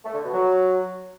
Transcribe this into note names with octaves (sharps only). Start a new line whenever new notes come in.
A3
D3
B2
F#3